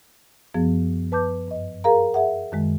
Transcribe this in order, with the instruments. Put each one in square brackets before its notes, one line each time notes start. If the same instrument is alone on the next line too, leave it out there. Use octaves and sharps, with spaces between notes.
[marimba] F#2 F3 B3 G#4
B4 A5 D6 G6
G2 D#5
G#4 A#4 F5 A#5
G#4 E5 F#5
F#2 D#3 G#3